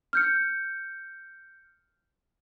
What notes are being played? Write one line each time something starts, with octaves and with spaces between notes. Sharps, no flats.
F6 G6 C#7